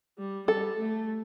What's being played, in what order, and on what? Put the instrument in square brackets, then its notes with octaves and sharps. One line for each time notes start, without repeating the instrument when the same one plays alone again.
[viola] G3
[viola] G3 [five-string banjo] A4
[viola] A3